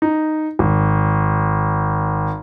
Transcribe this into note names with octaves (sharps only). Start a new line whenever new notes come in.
D#4
G#1